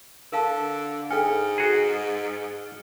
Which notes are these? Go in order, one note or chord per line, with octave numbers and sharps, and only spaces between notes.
D3 A#4 F5 A5
G#2 A4 G5 G#5 F6 C#7
F#4 G#4